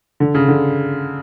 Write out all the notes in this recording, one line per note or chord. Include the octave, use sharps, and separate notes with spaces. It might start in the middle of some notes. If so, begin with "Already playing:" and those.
D3
C#3
D3